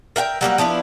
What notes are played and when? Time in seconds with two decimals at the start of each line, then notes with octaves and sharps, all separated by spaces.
0.16 A#4 E5 F#5 G5
0.41 F#3 G3 A#3 F#4
0.58 F3 B3 D4 E4